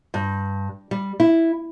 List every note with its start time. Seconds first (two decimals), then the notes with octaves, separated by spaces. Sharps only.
0.14 G2
0.91 G3
1.20 E4